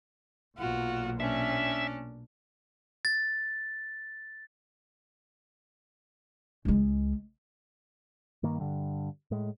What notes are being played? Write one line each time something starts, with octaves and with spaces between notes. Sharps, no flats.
B1 A#2 F4 F#4
C#4 D4 E5
A6
C#2 G#3
G2 D#3 A#3
G2 D3
A2 G#3